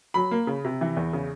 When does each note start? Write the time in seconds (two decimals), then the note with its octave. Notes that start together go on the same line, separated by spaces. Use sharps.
0.14 F#3 B5
0.31 A#3
0.47 C#3
0.65 C3
0.81 E3
0.97 E2
1.13 C#3